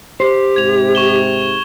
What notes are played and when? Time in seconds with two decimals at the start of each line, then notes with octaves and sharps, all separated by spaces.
0.20 G4 C5
0.56 G#2 C3 G#6 F7
0.95 C#6 E7 G7